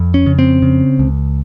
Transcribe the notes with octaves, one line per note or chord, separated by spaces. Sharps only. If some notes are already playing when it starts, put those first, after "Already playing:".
Already playing: F2
C#4
C#3
C4
C#3
C#2